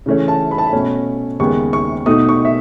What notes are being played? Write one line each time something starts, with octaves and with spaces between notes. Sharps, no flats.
C#3 E3 A3 C#4
A5
B5
A5
B5
B2 A3 C#4
D#2 C#3 G#3 B3 C#6
C#6
B2 A3 D#4 D#6
C#6
E5